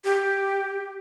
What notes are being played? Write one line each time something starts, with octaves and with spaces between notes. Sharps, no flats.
G4